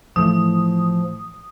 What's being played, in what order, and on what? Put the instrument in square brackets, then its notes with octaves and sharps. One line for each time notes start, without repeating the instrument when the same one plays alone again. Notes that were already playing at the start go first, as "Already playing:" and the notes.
[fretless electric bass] A2 E3 A3 [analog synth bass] F3 [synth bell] D#6